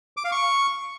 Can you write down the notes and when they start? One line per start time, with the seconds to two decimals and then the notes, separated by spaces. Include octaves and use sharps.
0.17 D6
0.24 F5
0.32 C#6